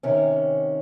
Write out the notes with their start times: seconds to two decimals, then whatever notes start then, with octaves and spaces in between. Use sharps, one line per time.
0.03 C3 D#3 C#4